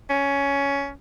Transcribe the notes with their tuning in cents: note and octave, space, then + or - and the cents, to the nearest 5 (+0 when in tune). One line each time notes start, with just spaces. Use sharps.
C#4 +15